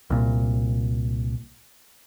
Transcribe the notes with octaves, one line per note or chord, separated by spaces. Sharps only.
C2 A#2